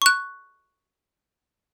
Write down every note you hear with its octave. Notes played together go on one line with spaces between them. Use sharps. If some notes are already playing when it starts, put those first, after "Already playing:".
C#6 F#6